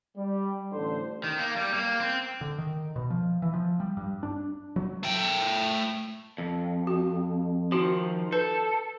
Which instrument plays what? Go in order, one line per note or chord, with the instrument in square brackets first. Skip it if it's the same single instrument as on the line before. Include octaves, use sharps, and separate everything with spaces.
[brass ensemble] G3
A1 D3 C5
[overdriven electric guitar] D#3
A#3
G3
A#3
C4
[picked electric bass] D3
D#3
B2
F3
E3
F3
G3
G2
D4
F#3
[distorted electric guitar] A3 G5
[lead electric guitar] F2
[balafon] F#4
[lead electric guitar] D#3 F3 [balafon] F#4
[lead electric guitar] A4 [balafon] B4